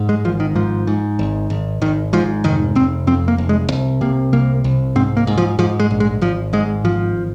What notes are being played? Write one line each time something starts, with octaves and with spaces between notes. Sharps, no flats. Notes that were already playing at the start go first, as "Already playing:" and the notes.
Already playing: G#2
G#3
G#1 F3
D#3
G#2 F3
G#2
G#1
G#1
G#1 D#3
G#2 F3
F1 D#3
F1 C4
F2 C4
A#3
F1
G#3
C2
C3 A#3
C2 A#3
C2
G#2 C4
A#3
G#2
F3
G#2 F3
G#3
A#1
G#3
G#1 F3
G#2 G#3
G#1 F3